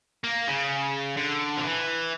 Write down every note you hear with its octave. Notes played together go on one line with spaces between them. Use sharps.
A#3
C#3
D3
F3
E3